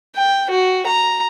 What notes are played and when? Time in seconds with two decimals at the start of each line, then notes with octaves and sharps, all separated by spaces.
0.16 G5
0.51 F#4
0.87 A#5